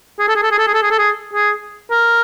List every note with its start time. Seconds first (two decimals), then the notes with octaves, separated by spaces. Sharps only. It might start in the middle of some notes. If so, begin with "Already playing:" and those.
0.19 G#4
0.28 A4
0.36 G#4
0.43 A4
0.51 G#4
0.58 A4
0.67 G#4
0.74 A4
0.83 G#4
0.91 A4
0.98 G#4
1.34 G#4
1.91 A#4